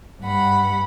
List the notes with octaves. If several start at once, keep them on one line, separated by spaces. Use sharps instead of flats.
G2 F#5 B5